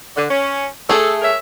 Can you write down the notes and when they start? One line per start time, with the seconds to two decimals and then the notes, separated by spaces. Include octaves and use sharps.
0.16 D3
0.30 C#4
0.89 A3 G#4 A4
1.21 A#4 C#5 E5